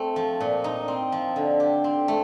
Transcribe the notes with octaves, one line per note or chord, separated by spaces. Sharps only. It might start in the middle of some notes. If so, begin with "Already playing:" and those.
Already playing: A3 C4
F3
A#2
D#4
C4
F3
D3
G4
C4
A3